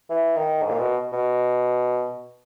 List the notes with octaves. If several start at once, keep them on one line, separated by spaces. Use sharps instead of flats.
E3
D#3
G#2
A#2
B2
B2